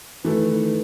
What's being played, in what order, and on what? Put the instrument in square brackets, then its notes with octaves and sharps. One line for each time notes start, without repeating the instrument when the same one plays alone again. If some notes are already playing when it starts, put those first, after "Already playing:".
[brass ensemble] D#3 B4 [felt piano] E3 A3